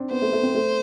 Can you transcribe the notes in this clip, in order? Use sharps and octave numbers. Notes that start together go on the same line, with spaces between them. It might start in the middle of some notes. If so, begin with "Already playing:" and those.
Already playing: C4 D4
B3 C5
A3
A3
C4
A3